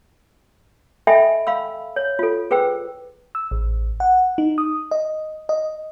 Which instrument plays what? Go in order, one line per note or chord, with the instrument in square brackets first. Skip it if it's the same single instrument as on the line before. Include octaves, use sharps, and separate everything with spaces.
[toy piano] A4 D#5 E5 G5 G#5 B5
F5 B5 E6
C#5
F4 A4
G#4 B4 C5 G5 E6
[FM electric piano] E6
A1
F#5
D#4
D#6
D#5
D#5